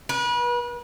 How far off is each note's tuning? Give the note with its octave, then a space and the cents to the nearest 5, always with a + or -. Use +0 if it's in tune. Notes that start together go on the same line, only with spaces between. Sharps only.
B4 -35